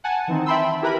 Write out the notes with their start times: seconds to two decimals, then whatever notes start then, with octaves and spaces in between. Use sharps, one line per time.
0.04 F#5 G#5 A5
0.28 D#3 E3 C4 D#4
0.46 E5 G5 A5 B5 C6 E6
0.82 E4 G4 A#4 B4 E5 B5